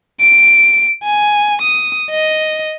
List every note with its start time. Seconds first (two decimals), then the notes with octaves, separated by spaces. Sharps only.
0.20 D7
1.03 G#5
1.61 D#6
2.10 D#5